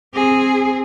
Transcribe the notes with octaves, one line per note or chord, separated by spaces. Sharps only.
C4 G#4